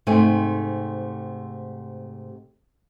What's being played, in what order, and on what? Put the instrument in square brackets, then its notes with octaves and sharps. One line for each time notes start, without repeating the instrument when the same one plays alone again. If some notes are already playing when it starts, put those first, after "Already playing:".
[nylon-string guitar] G#2 C3 A3 C4 G#5